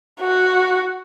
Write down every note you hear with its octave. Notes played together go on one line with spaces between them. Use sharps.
F#4